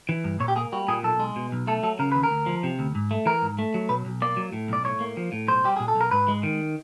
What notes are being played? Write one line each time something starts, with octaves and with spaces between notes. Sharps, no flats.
E3
G2
A#2 C#5
G4
A#3 G#4
G3 F#4
A#2 G#4
B1 A4
G#3
B2
B1
A3 A4
F#3 A4
C#3 A#4
D#2 B4
A#4
D2
F3
C3
D2
G#2
A3
E3 A#4
G#2
A3
F#3
B2 B4
B1
A#3 D5
F#3
A2
B1 D5
A2 C#5
A#3
F3
A2
B1 C5
G3 G4
A#2 G#4
A4
B1
A#4
G#2 B4
G#3
D#3